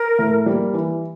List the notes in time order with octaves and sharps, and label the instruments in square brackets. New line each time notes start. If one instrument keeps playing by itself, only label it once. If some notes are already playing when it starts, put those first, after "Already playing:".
Already playing: [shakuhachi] A#4
[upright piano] A2
G3 A#3
E3